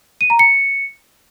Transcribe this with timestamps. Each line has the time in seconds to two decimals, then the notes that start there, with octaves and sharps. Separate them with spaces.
0.21 D#7
0.30 A#5
0.39 C#7